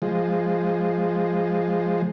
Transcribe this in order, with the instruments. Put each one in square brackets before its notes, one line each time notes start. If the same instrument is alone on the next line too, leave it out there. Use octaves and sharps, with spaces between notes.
[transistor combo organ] F3 G#3